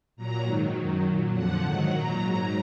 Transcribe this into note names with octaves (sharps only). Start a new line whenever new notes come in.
A#2 F#3 A#5
G#2 D#3 F#3
F#2 D#3 F#3
A#2 F#3
F2 D3 F3 F#5
G#2 D#3 F#3
A#2 F#3 A#5
G#2 F#3